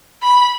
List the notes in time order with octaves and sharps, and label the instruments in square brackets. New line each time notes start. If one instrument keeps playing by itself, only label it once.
[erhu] B5